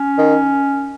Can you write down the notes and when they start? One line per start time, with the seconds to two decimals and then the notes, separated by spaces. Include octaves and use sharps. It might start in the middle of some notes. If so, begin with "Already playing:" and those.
Already playing: C#4
0.18 D#3